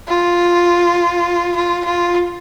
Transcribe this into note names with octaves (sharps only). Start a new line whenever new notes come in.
F4
F4
F4